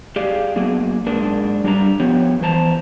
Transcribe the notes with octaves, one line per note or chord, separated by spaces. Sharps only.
G4 G#4 D5 F5
F#3 A#3 B3 G#4
G#2 D4 G#4 A#4
G3 D4 G4 D5 A#5
F3 B3 G4 C#5
E2 E3 C5 A5 A#5